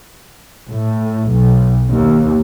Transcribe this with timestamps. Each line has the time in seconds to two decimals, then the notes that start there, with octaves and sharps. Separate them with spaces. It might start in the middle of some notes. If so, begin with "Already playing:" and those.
0.70 A2
1.32 B1
1.90 D#2